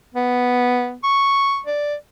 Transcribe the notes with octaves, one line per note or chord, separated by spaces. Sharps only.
B3
C#6
D5